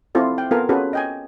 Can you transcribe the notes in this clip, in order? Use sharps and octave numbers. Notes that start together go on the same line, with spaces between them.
C4 E4 F4 A4 D5
F5 G5
B3 F4 A4 A#4 F5 G#5
C#4 F4 F#4 G#4 A4 B4
D#5 G5 G#5